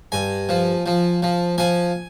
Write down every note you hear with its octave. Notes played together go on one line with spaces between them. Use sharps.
G2 G#5
F3
F3
F3
F3 G#5